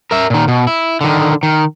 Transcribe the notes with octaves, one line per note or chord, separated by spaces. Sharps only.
A#4 E5
A#2 D#3
B2
E4
D3 D#3
D#3